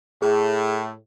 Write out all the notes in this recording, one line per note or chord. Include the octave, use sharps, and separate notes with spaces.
A2 G#4